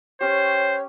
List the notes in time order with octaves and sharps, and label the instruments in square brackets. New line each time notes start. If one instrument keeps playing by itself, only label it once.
[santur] C#4 G4 [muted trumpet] C5 [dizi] C#5